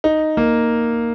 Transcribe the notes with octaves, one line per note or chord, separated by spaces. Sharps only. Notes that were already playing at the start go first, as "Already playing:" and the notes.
D#4
A#3